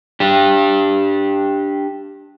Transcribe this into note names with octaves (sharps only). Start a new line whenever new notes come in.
D4 G4